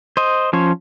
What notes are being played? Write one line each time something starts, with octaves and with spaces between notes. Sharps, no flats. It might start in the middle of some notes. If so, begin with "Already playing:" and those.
C5 D#5
F3 C#4 C5 C#5